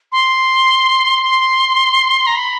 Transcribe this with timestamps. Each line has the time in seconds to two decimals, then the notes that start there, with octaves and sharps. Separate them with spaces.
0.12 C6
1.23 C6
2.27 A#5
2.35 B5